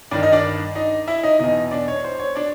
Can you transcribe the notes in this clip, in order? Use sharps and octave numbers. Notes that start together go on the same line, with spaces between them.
G2 D#3 D4 D5
D#4 D#5
D4 D5
D#4 D#5
E4 E5
D#4 D#5
E2 B2 D#4 D#5
D4 D5
C#5
C5
C#5
D4 D5